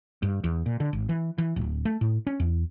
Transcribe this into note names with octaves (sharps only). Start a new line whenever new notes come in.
G2
E2
A#2
D3
G#1
E3
E3
D1
A3
A2
C#4
E2